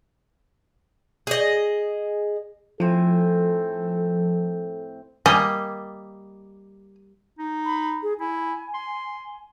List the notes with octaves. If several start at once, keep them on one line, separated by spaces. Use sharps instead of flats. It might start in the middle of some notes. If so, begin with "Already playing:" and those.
G#4 D#5
A2 F3 C4 A4 G#5
G3 A#3 D#5 G#5
D#4
B5
G#4
E4 G#5
C6